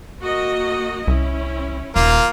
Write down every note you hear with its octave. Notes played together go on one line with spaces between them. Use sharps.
A#3 F#4 D#5
C2 C#4 E4
D#1 A#3 F4